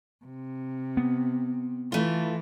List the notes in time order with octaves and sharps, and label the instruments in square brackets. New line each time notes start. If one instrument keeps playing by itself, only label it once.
[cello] C3
[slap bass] B3
[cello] E3 [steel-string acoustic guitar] A3 F4